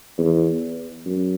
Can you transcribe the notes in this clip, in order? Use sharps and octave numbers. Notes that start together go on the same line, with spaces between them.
E2
F#2